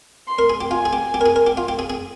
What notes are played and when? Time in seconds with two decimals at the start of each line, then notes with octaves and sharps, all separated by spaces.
0.28 C6
0.39 A#4
0.50 G#4
0.61 G4
0.71 F4 G#5
0.85 G#4
0.93 G4
1.14 G4
1.21 A#4
1.26 G#4
1.36 A#4
1.47 G4
1.57 F4
1.68 G4
1.79 G#4
1.90 G#4